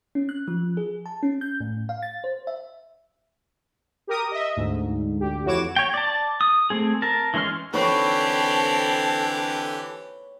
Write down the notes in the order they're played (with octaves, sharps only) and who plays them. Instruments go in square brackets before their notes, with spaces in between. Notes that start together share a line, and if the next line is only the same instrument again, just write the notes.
[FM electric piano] C#4
F#6
F3
G#4
A5
C#4
G6
A2
F5
A6
C5
E5
[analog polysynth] G4 A#4 D#6
D#5 E5
D2 G#2
D2 G4
F2 E3 F#4 C#5 D6 E7
[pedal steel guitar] C#5 G5
D5 A5
D#6
A3 C4 G#4
A#4 A5
E3 G#3 C#4 C6 F6
[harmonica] D3 E3 G4 [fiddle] C4 [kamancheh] A4 [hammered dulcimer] B4 C#5